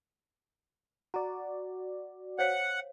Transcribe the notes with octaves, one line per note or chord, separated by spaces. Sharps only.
F#4 D5 A#5
C5 C#5 F5 F#5